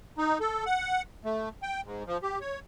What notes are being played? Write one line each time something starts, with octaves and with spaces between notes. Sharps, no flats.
D#4
A4
F#5
A3
G5
G#2
F3
G4
C#5